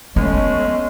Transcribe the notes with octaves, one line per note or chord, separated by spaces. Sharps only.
G#3 A3 B3 C#4